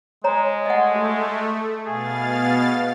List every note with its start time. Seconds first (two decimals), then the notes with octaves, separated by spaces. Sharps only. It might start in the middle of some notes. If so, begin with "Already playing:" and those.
0.24 G#3 C#5 A#5
0.66 A3 D#5 F#5
0.95 F#4
1.86 B2 G#4 F5 A6